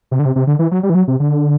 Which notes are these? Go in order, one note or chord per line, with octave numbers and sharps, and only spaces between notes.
C3
D3
C3
C3
D3
E3
F#3
G3
E3
F#3
C3
D3